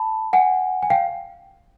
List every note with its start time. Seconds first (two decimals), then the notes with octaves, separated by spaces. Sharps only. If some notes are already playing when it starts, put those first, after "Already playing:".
Already playing: A5 B5
0.33 F#5 G#5
0.82 G#5
0.90 F5 G5